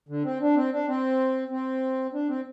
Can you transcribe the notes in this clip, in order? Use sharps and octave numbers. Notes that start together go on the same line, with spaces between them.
D3
C4
D4
C4
D4
C4
C4
D4
C4